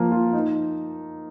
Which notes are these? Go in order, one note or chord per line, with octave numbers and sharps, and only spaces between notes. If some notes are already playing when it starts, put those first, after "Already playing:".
Already playing: F3 A#3 F4
F4
D#4